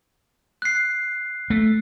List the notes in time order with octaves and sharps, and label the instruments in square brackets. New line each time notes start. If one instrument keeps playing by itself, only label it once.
[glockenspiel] F#6 C7
[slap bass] A3